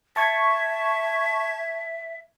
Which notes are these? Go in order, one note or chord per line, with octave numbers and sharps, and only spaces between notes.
E5 A5 C#6 G#6